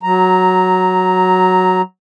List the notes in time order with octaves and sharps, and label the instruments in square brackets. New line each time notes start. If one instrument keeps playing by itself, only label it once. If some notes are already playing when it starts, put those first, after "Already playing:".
[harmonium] F#3 A#5